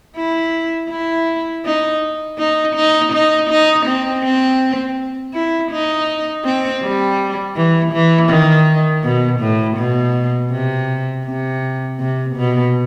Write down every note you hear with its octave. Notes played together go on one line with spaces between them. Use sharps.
E4
E4
D#4
D#4
D#4
D#4
D#4
C4
C4
E4
D#4
C4
G3
E3
E3
D#3
B2
A2
B2
C3
C3
C3
B2